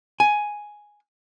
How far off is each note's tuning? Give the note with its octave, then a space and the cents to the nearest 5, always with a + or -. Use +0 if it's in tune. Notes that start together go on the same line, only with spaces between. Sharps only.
G#5 +5